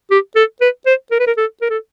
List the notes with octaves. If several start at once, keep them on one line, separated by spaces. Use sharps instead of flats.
G4
A4
B4
C5
A#4
B4
A#4
A4
A#4
A4